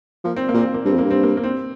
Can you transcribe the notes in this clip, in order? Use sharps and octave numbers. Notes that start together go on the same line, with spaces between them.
F3 A#3
C4
A#3
A#2
C4
A#3
G2 C4
F2
G2 A#3
C4
A#3
A#3
C4